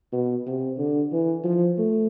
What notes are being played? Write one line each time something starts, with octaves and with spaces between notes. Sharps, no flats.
B2
C3
D3
E3
F3
A3